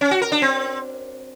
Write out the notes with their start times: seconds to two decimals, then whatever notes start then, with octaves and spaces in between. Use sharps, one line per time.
0.01 C#4
0.11 F#4
0.21 A#4
0.32 D4
0.42 C4